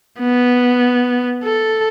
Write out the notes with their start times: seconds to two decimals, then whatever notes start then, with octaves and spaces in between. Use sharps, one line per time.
0.20 B3
1.44 A4